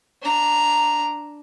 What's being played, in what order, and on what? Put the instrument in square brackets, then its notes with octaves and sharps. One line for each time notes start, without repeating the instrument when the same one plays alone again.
[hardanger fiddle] D4 A#5